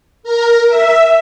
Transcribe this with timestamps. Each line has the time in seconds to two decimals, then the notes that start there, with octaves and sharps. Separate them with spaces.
0.23 A#4
0.68 E5